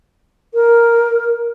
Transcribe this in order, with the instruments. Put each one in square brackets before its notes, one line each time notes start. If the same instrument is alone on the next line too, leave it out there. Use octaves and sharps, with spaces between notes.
[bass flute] A#4